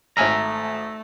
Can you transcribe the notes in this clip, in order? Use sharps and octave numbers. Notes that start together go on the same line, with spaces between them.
G#1 A3 E5 G#5 A#5 F6